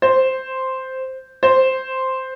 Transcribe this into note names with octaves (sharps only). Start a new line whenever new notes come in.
C5
C5